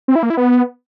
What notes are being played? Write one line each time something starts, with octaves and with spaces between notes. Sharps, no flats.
C4
E4
A#3
E4
B3